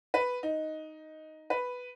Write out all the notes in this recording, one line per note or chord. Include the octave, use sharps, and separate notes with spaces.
B4
D#4
B4